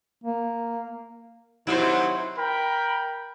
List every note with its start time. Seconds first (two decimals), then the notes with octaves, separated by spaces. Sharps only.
0.24 A#3
1.67 C3 D#3 F#3 E4 C5
2.38 A#4 G5 B5